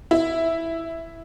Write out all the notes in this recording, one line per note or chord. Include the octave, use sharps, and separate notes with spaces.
E4